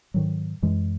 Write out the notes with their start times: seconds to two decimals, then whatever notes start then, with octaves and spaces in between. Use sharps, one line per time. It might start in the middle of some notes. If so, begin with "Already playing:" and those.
0.14 G#2 D#3 F#3
0.62 F#2 E3 G#3